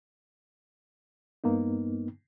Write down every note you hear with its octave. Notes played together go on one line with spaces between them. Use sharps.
G2 A#3 B3 D#4